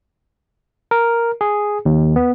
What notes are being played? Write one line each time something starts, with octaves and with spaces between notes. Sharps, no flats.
A#4
G#4
D#2
B3